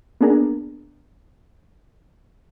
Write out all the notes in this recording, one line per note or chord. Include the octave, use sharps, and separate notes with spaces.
A#3 B3 D4 G#4 A#4